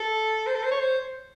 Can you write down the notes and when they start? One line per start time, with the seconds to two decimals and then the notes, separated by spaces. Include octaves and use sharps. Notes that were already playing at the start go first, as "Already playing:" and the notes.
Already playing: A4
0.47 C5
0.55 A4
0.63 C5
0.71 C#5
0.80 C5